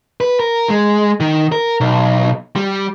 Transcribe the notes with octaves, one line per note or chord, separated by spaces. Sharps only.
B4
A#4
G#3
D#3
A#4
B1
G3